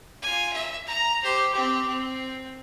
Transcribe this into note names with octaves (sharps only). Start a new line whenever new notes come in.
F4 G#5
E5
A#5
G4 C5
C4 G4
C4